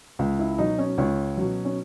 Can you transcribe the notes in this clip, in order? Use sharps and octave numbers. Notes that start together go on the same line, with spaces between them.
C#2
E4
B2 F#3 D#4
C#4
C#2 C#4
B2 F#3
C#4